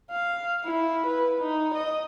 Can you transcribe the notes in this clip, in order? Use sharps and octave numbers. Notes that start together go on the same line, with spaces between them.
F5
E4
B4
D#4
D#5